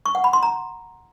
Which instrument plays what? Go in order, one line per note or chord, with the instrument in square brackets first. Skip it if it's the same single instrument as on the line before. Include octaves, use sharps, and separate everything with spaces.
[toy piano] C#6
F#5
B5
C6
A#5